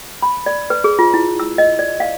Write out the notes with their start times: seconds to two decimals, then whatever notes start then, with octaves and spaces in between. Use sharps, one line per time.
0.22 B5
0.46 D5
0.70 B4
0.84 G#4
0.99 F4
1.14 E4
1.40 E6
1.58 D#5
1.79 D5
2.00 F5